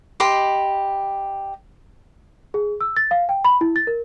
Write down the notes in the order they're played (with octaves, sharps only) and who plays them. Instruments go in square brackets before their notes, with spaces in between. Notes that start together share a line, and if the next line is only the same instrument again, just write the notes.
[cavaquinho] G4 D#5 B5 C6
[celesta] G#4
E6
A6
F5
G5
B5
E4
A6
A#4